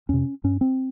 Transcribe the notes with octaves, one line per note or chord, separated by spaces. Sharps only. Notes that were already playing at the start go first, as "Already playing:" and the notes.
F2 C3 C#4
G2 C#4
C4